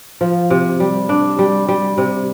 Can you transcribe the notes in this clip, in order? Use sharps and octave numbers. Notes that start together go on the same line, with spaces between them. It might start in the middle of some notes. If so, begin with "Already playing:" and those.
F3
C3
G3
D4
G3
G3
C3